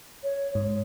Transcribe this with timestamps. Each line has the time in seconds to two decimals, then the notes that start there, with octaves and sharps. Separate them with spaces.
0.24 C#5
0.55 G#2